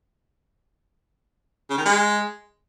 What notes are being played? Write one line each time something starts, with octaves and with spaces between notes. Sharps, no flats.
C#3
D#3
G#3